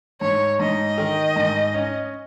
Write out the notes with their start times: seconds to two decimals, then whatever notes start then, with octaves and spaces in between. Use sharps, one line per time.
0.21 G#2 C#5
0.60 G#2 D#5
0.98 D#3
1.36 G#2
1.74 C#4